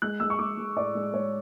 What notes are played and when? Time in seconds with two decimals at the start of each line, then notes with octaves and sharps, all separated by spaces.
0.02 G#3 F#6
0.20 G#3 E6
0.30 C#6
0.39 G#3 D6
0.57 G#3
0.76 A2 D5
0.95 G#3
1.13 G#3 C#5